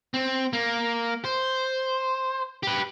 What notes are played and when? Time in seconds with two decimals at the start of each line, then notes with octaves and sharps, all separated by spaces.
0.14 C4
0.53 A#3
1.25 C5
2.63 G4 B4